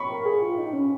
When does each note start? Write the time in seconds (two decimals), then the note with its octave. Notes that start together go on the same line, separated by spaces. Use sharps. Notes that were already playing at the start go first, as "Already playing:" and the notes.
Already playing: B5 C#6
0.10 A#4
0.25 G#4
0.42 F4
0.58 D#4
0.73 C#4